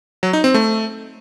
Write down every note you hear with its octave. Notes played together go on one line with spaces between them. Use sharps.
F#3
D#4
C4
A3